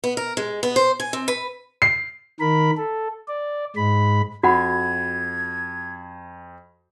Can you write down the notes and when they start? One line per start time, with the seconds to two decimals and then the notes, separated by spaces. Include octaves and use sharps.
0.04 B3
0.17 A#4
0.37 G#3
0.63 B3
0.76 C5
1.00 G#5
1.13 C4
1.28 B4
1.82 C7
2.40 D#3 A#4 B5
2.77 A4
3.28 D5
3.76 G#2 G#3 B5
4.43 F2 F#4 F#5 B5 G#6